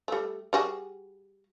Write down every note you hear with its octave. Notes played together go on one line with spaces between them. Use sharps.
G3 A3
G3 F#4 G#4